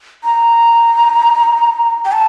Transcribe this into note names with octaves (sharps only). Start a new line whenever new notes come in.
A#5
G5
A5